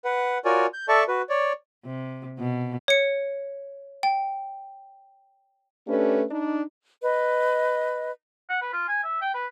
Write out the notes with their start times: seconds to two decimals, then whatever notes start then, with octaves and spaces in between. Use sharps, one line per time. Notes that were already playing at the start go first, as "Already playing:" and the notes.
0.05 B4 F#5
0.45 F4 F#4 A#4 C#5 D5 G#5
0.74 G6
0.88 A4 D5 E5 A5 C#6
1.08 F#4 B4
1.29 C#5 D5
1.85 C3
2.39 B2
2.88 C#5 C#7
4.03 G5
5.87 A3 C#4 D4 G4 A4 B4
6.30 D4 D#4
7.02 B4 D#5
8.49 F#5
8.62 B4
8.73 F4
8.88 G#5
9.04 E5
9.21 G5
9.34 B4